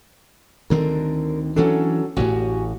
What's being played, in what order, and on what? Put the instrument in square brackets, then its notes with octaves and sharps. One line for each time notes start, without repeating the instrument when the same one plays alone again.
[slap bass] D2 D#3 C4 [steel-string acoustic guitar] D3 A#4
[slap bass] E3 D4 [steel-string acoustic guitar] F#3 C#4 A4
[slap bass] A1 A2 [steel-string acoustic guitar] F#4 G4 G#5